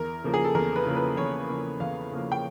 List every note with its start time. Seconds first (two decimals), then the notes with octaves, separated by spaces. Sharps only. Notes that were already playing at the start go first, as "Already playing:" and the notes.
Already playing: E2 A#4
0.24 C#3 F3 A#3
0.34 G#4
0.44 A4
0.55 E2 A#4
0.76 B4
0.87 C#3 F3 A#3
0.96 B4
1.17 E2 C#5
1.49 C#3 F3 A#3
1.80 E2 F5
2.12 C#3 F3 A#3
2.32 G5